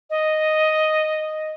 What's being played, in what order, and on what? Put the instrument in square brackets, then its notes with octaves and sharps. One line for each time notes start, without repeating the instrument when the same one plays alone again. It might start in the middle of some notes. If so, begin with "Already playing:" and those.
[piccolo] D#5